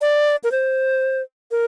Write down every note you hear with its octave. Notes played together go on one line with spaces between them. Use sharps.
D5
A#4
C5
A#4